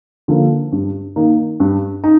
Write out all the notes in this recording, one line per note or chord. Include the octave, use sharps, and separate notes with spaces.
D3 F3 A#3
G2
D#3 A#3 D#4
G2
D#4